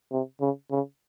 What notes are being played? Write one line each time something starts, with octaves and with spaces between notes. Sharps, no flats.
C3
C#3
C#3